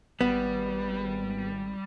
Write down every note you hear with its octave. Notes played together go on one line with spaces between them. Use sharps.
G#1 G3 B3